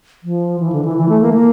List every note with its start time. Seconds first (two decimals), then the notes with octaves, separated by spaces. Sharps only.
0.23 F3
0.60 E3
0.72 D3
0.85 E3
0.97 E3
1.09 A3
1.21 A#3
1.34 A#3